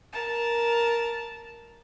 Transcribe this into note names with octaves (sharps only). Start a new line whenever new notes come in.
A#4 A5